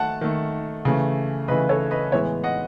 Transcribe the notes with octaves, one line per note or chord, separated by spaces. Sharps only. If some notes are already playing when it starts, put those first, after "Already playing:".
Already playing: D#3 A3 F#5 A5
D#3 A3
C#3 E3 A3
C#3 E3 A3 B4 D#5
A4 C#5
B4 D#5
A2 E3 G#3 B3 C#5 E5
D#5 F#5